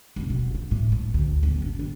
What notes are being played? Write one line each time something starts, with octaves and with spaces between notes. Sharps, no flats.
F1
B2
F4
A2
A2
D2
G1
D4
G1